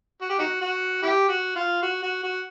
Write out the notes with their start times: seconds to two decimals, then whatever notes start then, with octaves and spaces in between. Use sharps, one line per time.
0.22 F#4
0.30 G4
0.39 D#4 F#4
0.61 F#4
1.03 E4 G4
1.29 F#4
1.56 F4
1.83 F#4
2.03 F#4
2.24 F#4